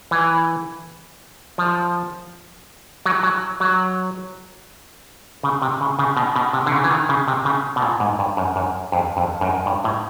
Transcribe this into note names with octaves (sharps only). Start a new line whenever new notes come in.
E3
F3
F#3
F#3
F#3
C#3
C3
C#3
C#3
B2
B2
C3
D3
C#3
E3
D#3
C#3
C3
C#3
B2
A#2
G#2
G2
F#2
F#2
F2
F2
F#2
G2
A2